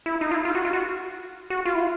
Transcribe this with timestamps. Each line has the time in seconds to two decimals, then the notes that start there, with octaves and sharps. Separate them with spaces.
0.06 E4
0.21 D#4
0.31 F4
0.35 E4
0.45 F4
0.55 F#4
0.65 F4
0.73 F#4
1.50 F#4
1.65 F4
1.75 E4
1.80 F4